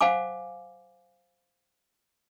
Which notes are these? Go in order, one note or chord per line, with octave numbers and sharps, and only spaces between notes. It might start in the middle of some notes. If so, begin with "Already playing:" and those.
C5 F5 F#5 G#5 D6